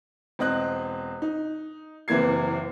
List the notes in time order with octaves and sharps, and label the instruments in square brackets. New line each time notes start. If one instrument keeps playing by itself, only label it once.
[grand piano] E1 C4 D#5 F#6
D#4
F#1 C3 E3 A#3 G#6 C7